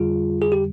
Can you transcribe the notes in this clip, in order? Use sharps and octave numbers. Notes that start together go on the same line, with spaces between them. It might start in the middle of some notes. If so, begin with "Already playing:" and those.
Already playing: F2 D3 G3 F4 G#4
G#4
G4